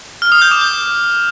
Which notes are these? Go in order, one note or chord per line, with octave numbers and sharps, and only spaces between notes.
F6
D#6
G6
D6
G6